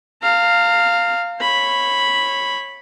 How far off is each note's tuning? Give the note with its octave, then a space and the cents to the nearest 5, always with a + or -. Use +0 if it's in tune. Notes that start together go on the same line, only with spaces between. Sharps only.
F5 +0 A#5 -40
C#5 -20 B5 +0